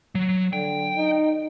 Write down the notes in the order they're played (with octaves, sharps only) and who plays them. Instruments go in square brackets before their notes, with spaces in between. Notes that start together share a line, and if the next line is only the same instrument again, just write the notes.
[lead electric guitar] F#3
[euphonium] D3 [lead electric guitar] G5
[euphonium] D#4